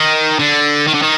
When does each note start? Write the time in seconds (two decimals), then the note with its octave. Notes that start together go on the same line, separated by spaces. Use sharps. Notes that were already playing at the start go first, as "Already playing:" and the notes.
Already playing: D#3
0.39 D3
0.87 D#3
0.94 D3
1.02 D#3